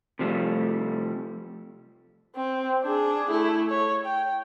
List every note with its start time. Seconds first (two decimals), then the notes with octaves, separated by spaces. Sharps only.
0.19 C3 F3 G3 A3
2.35 C4
2.83 D4 G#4
3.30 A3 E4
3.69 C#5
4.05 G5